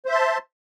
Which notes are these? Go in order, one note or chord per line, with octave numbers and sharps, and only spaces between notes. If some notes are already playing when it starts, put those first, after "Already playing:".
C5 E5 A5 C6